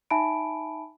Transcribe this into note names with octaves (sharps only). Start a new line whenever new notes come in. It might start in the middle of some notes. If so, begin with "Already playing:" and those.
D#4 E5 G#5 A5 B5 D7